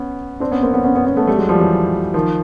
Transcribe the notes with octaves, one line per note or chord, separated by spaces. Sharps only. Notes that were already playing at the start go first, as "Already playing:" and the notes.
Already playing: B3 C#4
C4 D4
B3 C#4
A#3 C4
B3 C#4
B3 C#4
B3 C#4
B3 C#4
A3 B3
G3 A3
F#3 G#3
F3 G3
E3 F#3
D#3 F3